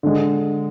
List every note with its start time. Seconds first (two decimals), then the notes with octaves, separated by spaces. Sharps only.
0.03 D3 G#3